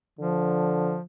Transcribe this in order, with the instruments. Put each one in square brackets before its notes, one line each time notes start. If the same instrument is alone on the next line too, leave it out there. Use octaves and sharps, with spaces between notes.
[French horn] D3 [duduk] F3